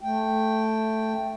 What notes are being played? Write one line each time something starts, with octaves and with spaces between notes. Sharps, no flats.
A3 G5